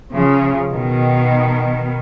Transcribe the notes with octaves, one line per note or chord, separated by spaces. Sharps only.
C#3 F3
B2 D#3